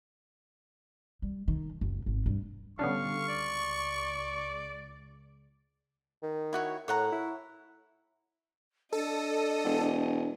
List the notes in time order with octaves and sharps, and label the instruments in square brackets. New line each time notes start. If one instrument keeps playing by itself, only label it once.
[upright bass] G3
D#3
F#1
G#1
G2
[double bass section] D3 G3 [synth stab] B3 C#4 D4 [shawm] F5 [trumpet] C#6
[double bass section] C#2 [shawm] D5
[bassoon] D#3
[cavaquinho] E4 F#4 C#5
[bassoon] A2 [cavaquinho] C#5 F#5 A#5
[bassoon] E4
[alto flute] D4 [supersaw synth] A4 [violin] D#5
[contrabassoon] E1